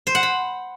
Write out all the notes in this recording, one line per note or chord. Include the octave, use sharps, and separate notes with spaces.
C5
F#5
B5